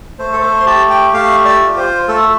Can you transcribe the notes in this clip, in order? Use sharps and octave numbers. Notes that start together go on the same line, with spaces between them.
A3 C5
A4
C5
C6
G4 A5
G5
A3 F5
D5
F4
C5
A3 A4